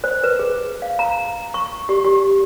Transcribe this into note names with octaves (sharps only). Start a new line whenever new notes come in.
C5
B4
G#4
F5
A#5
C#6
G4
G4